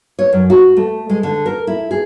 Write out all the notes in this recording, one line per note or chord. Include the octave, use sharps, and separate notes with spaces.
C#5
F#2
F#4
A3
G#3
D3
A#4
E4
G#4